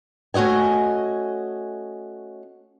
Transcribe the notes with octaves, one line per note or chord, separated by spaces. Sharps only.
A3 C#4 F#4 D#5 G#5